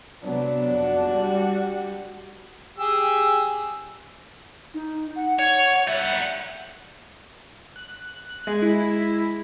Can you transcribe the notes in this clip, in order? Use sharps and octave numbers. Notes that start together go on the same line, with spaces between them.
C3 F#3 B3 D4
F2 F#4
G3
G4 G#4 E6
D#4
F#5
C#5
G3 E5 F#5
F#6
G#3
E4